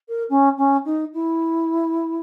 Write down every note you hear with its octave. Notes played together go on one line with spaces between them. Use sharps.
A#4
C#4
C#4
D#4
E4